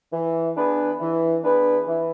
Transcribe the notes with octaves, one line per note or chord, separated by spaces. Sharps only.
E3
B3 D4 G#4 B4
E3
B3 D4 G#4 B4
E3